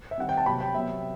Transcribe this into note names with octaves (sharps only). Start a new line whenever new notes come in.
E5
D#3 G3 C4 F#5
G5
A5
C3 F#3 B3 B5
G5
C3 F#3 B3 E5